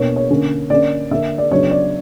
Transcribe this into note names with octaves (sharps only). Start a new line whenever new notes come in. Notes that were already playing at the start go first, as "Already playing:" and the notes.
Already playing: B2 A#3 D4 C#5
C#5
D3 A#3 C#4
D3 A#3 C#4 D5
D3 A#3 D4 E5
D5
C#3 F#3 B3 D4 C#5
D5